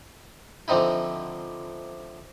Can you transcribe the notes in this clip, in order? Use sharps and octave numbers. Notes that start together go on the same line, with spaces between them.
D3 F3 C4 D#4 E4